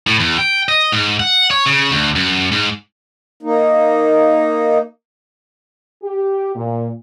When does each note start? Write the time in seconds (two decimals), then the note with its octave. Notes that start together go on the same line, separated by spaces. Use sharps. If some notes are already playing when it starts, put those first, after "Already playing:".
0.07 A2
0.20 E2
0.38 G5
0.69 D#5
0.92 G#2
1.20 F#5
1.51 C#5
1.66 C#3
1.91 D2
2.16 F#2
2.52 G#2
3.43 A#3 D#4
6.03 G4
6.56 A#2